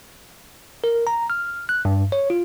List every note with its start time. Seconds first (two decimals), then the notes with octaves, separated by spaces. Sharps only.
0.84 A#4
1.07 A#5
1.30 F6
1.69 F#6
1.85 G2
2.12 C#5
2.30 F4